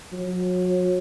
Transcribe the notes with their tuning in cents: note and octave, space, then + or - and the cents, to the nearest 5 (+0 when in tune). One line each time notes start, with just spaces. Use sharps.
F#3 -30